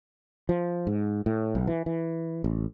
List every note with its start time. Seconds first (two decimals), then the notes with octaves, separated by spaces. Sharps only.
0.49 F3
0.87 G#2
1.26 A2
1.55 B1
1.67 E3
1.86 E3
2.44 A1